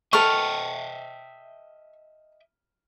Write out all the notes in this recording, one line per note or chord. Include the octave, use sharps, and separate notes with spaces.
A4 B4 D#5 E5 G5 C#6 F6